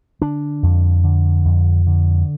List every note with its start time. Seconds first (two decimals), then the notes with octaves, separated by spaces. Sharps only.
0.21 D3 D4
0.63 F2
1.04 D3
1.45 F2
1.87 D3